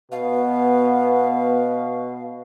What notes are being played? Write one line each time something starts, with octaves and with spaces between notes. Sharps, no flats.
B2 B3 F5